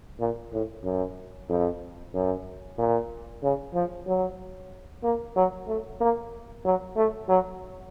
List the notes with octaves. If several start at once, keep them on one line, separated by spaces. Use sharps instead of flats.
A#2
A2
F#2
F2
F#2
A#2
C#3
F3
F#3
A#3
F#3
A3
A#3
F#3
A3
F#3